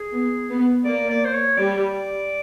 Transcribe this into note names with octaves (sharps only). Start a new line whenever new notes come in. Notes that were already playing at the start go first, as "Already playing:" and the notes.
Already playing: G#4
B3
B3
A#3 D5
D5
C5
C#5
G3 D5